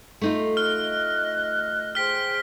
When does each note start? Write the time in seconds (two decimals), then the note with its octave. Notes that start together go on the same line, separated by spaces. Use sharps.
0.21 A3 D#4 F4
0.57 D#5 F6 F#6
1.95 G#4 C5 G5 F6 B6